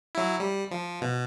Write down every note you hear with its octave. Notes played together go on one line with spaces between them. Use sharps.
F#3 E4
G3
F3
B2